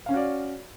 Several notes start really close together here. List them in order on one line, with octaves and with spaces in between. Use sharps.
F5 C#4 C#5 F#4 D5